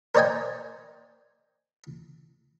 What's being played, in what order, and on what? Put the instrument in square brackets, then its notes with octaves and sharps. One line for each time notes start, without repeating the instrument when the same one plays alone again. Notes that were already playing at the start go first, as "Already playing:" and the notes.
[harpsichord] A#4 C5 D5 D#5 G5 G#5